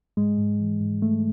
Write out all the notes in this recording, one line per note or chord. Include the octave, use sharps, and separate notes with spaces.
G#2 G#3
G#2
E3
G#2
G#2 A3